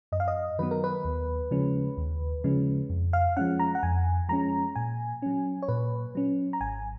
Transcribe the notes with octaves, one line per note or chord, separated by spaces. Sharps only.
F#2 D#5
F5
D#5
D#3 F#3 B3 B4
A#4
B4
D#2
C#3 F3 G#3 C#4
D#2
C#3 F3 G#3 C#4
F2
F5
F3 G#3 C#4 F#5
A#5
F#5
F2 G#5
F3 G#3 C#4 A#5
A#2 G#5
F#3 C#4
C#5
A#2 B4
F#3 C#4
A#5
G#1 G#5